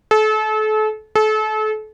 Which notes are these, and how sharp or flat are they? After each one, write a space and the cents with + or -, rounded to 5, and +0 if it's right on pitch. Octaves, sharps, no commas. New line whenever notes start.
A4 -35
A4 -35